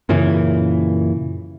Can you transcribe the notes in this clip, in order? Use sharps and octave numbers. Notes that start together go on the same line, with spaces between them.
F#2 A#2 C#3 E3